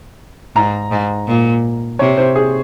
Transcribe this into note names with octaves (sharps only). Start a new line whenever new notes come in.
G#2 A#5
G#2
A#2
C3 C#5
C5
G#4